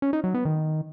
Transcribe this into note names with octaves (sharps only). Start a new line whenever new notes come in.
C#4
D#4
F#3
B3
D#3